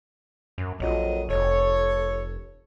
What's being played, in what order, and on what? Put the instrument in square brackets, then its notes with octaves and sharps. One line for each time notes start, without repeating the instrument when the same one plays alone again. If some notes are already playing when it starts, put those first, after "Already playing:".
[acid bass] F#2
[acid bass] A#1 [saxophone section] F2 F#3 D#5
[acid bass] F1 [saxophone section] A4 C#5